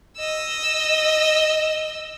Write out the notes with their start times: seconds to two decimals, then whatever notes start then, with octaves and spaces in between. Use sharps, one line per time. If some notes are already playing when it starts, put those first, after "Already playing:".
0.18 D#5 E6